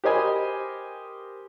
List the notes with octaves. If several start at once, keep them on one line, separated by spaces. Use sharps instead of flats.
G4 A#4 C5 D#5 G#5 B5